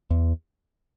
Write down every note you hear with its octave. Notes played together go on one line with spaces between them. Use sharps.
E2